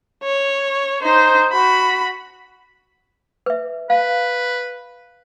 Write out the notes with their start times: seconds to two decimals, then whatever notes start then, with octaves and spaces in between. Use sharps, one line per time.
0.23 C#5
1.02 D#4 C5
1.52 F#4 B5
3.46 B4 E5
3.90 B4 F5